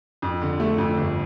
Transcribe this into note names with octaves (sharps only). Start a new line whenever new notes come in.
F2
D3
A3
F2
G1